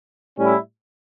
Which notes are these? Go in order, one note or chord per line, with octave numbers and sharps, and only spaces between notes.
A2 G3 C#4 E4